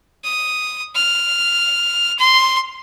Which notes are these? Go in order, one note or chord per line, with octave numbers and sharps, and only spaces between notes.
D#6
F6
C6